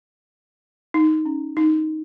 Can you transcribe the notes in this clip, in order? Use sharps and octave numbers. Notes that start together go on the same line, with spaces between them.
D#4
C#4
D#4